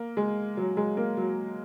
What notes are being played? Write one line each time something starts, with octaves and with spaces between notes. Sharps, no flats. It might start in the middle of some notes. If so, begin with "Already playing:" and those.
Already playing: A#3
G#3
F#3
G#3
A#3
F#3